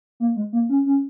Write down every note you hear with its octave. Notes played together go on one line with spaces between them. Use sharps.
A#3
G#3
A#3
C#4
C#4